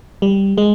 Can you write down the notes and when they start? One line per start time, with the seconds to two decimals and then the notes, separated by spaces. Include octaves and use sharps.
0.22 G3
0.58 G#3